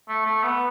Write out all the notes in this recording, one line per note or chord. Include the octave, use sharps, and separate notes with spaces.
A3
A3
B3